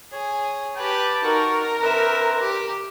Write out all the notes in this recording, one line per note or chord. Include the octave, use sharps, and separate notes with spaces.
G#4 C#5
G4 B4 G5 A5
D#4 F#4 A#4 C#6
D3 C4 B4 E5 A#5
G4